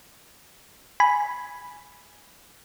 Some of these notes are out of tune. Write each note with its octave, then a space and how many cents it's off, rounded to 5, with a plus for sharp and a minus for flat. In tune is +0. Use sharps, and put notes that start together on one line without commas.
G#5 +0 B5 +0